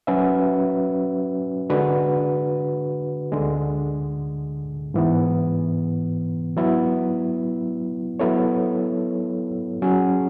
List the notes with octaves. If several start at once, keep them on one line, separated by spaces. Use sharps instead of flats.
F#3 C#4 F#4 B4 E5
D3 G#3 D4 F#4 B4
D2 D3 G#3
G#2 E3 B3
F#3 B3 E4
F#3 B3 E4 A4 C#5
F#3 C#4 G#4